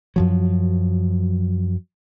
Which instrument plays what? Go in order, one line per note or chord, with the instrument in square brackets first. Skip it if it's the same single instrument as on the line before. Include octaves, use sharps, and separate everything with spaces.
[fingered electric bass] F#2 F3 F#3